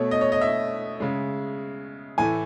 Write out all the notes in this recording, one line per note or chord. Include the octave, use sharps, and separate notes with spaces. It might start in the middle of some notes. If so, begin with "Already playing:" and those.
Already playing: B2 A3 C#5
D#5
C#5
D#5
E5
C#3 G#3
A2 E3 A3 G#5